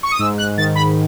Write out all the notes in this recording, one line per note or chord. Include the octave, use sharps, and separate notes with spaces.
C#6
D#6
G#2 E6
F#6
D#3 A6
B5